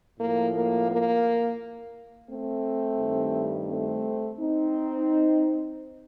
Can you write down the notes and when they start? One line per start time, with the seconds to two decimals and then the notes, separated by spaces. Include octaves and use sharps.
0.18 A2 F3 A#3
0.53 A#3
0.89 A#3
2.28 A3 C4
2.98 G2 D#3 G3
3.68 A3 C4
4.38 C4 D#4